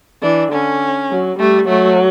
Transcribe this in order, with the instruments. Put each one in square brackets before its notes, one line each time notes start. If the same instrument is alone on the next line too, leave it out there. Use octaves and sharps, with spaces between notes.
[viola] E3 [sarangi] D4
[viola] D3 [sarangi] C#4
[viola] F#3
[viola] G3 [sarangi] A3
[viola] F#3 [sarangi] A3